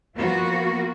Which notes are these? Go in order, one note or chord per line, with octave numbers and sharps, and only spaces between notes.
F3 A#3 B3 F4 F#4